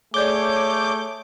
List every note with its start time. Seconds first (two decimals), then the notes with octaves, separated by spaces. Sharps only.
0.14 A3 G#4 C#5 D5 D6 G6 G7